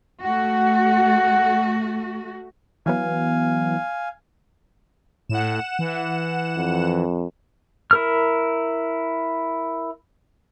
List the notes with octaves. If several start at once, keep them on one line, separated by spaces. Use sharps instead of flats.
A3 F#4 F#5
E3 F#3 B3 F5 G#5
A2 F#5 E7
E3
F2
E4 A#4 F6